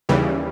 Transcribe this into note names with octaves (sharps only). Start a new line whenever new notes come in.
D#2 C#3 E3 G3